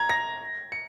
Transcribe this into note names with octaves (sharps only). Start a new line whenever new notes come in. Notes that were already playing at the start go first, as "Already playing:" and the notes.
Already playing: A#5 G#6
A#6
C#7